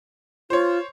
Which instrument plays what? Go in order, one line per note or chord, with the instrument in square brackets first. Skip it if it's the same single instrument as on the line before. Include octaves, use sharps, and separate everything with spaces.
[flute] F4 [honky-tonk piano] C5 C#5